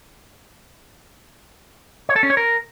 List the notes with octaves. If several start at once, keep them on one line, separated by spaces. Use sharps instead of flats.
C#5
A4
C#4
C#5
A#4